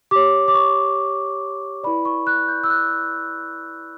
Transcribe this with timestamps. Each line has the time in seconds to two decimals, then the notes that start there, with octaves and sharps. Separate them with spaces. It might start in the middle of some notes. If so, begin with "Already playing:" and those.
0.11 G4 C#5 D6
0.48 D6
0.54 C#6
1.84 E4 B4 D5 B5
2.05 C#6
2.27 F#6
2.48 G6
2.64 E6
2.70 F#6